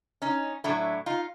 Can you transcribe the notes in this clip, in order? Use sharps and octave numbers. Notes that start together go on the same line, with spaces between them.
C#4 D#4
A2 F#3 A3 D4 E4
D#4 F4